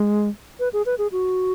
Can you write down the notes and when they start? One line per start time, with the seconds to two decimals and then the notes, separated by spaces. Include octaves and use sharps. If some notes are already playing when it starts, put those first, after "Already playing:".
Already playing: G#3
0.60 B4
0.73 G#4
0.86 B4
0.98 G#4
1.12 F#4